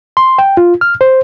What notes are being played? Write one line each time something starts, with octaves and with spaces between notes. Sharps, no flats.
C6
G5
F4
F6
C5